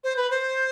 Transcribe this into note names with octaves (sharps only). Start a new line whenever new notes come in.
C5
B4
C5